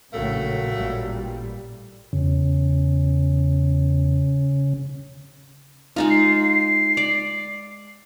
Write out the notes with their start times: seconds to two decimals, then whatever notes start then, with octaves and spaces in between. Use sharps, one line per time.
0.12 A#1 A2 C#3 F#3 A3 A#3
0.76 A1 A#2 G3
2.13 E2 C#3
5.96 G#3 D#4 F4
6.10 C7
6.97 D5